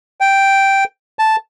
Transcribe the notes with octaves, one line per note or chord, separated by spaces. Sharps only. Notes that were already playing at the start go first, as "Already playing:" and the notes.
G5
A5